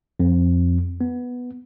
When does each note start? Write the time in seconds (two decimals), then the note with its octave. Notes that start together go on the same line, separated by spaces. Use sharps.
0.20 F2
1.01 B3